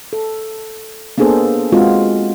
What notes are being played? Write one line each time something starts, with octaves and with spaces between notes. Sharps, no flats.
A4
A#3 B3 D4 G#4 A4 C5
G#3 C4 F4 F#4